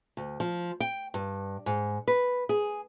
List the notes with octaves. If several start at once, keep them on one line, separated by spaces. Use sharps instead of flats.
D2
F3
G5
G2
G#2
B4
G#4